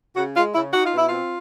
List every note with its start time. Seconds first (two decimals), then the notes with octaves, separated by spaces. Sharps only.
0.17 C#3 F#4
0.36 G#3 F4
0.55 C#3 E4
0.73 D#4 F#4
0.85 F4
0.93 B2 E4
1.08 C4 F4